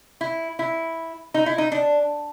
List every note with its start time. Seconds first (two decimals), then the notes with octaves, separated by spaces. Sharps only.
0.21 E4
0.59 E4
1.34 D#4
1.46 E4
1.58 D#4
1.72 D4